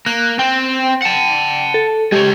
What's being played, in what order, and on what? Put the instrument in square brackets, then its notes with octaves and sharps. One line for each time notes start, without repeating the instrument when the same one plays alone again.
[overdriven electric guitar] A#3 [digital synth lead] F#6
[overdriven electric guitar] C4 [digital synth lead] G5
[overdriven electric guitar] F#5 A5
[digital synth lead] A4
[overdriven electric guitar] G#3 C#5 [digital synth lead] G4